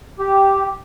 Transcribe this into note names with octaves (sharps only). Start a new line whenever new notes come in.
G4